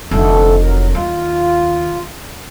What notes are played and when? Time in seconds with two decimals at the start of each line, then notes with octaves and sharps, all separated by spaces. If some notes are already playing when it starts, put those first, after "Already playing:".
0.11 F1 D3 A3 A4
0.63 F#3 A#4
0.95 D#2 F4